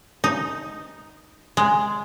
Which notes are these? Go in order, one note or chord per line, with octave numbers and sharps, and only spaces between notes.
D#4
G#3